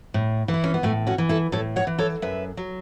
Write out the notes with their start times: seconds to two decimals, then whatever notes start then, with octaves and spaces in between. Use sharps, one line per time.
0.14 A2
0.48 E3
0.54 E4
0.64 C#4
0.74 B3
0.83 A2 A3
1.07 C#4 F#4
1.18 E3
1.29 E4 A4
1.52 A2 A4 C#5
1.76 C#5 F#5
1.87 E3
1.99 A4 C#5
2.22 F#2 B4 E5
2.57 F#3